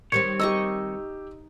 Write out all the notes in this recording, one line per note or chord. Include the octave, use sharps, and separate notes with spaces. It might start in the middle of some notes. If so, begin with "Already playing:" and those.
D#3 G3 C4 C#5
D#4 G4 D#5 C#6 E6